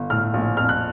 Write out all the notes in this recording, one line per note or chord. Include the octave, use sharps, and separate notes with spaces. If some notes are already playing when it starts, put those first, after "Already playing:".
Already playing: G1
A2 F6
A#1
F2 F6
F#6